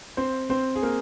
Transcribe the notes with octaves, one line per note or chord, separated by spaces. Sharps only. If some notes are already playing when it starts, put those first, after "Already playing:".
C4 C5
C4 C5
G#4
A#3 A#4